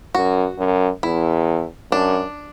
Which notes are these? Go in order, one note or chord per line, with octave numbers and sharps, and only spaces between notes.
F#2 F#4
F#2
E2 E4
F#2 D4